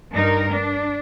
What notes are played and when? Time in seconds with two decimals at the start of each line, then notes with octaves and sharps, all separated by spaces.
0.13 G2 D#4 A#4
0.51 D4